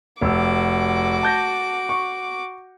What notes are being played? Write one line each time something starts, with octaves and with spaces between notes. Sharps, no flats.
F1 F#4 D6 E6
A5 G6 A#6
C#6